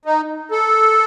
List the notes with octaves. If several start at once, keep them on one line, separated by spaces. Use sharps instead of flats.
D#4
A4